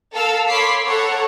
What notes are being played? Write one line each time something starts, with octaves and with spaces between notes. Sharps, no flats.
A4 A#4 F5 E6
C#5 B5 C6 D6 B6 C7
A4 C#5 F#5 A#5